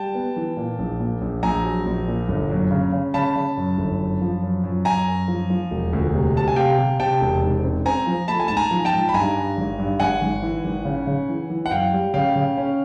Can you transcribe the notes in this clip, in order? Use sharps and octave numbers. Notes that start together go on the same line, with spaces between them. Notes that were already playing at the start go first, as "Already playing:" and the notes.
Already playing: G3 G5 A5
B3
E3
A#2
A#1
A#2
A#1
A#1 G#5 A#5
F#3
A#1
A#2
G1
F#2
C#3
C#3
C#3 A5 B5
C#3
F#2
G1
F#2
F3
F#2
F#2
F#2 G#5 A#5
F#2
F3
F3
E1
D2
C3
C3 A5
G#5
C3 F5 G5
C3
C3 G5 A5
E1
G#2
C4
C4 G#5 A#5
F3
A3 A5 B5
G#5
G#2 A5
G#5 A#5
F3
G5 A5
G#2
B5
G2 G#5 A#5
G2
G#1
G2
G#1 F#5 G#5
G#1
E3
G#1
C#3
C#3
E3
E3
F#5
F#2 F5 G5
G3
C#3 F5 G5
C#3
C#4